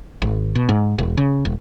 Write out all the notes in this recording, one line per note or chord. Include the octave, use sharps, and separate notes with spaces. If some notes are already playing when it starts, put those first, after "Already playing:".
G#1
B2
G#2
E1
C#3
E1